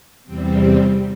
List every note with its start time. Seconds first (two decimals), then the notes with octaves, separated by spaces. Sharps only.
0.24 E2 C3 G3 C4